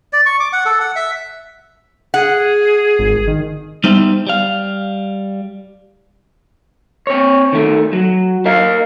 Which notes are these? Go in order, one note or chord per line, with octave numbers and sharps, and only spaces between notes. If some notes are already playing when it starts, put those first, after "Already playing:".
D5
C#6
D6
F#5
A4
F#5
E5
G#4 F#5
G#1
D#3
G3 B3 D#4 G4 C5 E5
G3 F5
C4 C#5
D#3 A3
F#3
A#4 D#5 F5